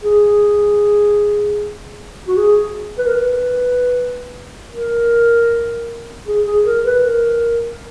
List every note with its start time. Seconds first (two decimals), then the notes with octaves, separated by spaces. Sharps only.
0.03 G#4
2.28 F#4
2.37 G#4
2.98 B4
3.06 A#4
3.15 B4
4.70 A#4
6.27 G#4
6.45 G#4
6.65 A#4
6.85 B4
7.05 A#4